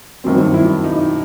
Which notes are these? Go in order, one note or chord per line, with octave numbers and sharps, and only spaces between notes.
G2 D#3 F#3 C4
E4
D#4